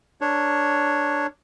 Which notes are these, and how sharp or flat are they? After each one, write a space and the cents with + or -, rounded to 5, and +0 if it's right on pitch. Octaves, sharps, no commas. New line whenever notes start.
D4 +0 A#4 -20 C#5 +0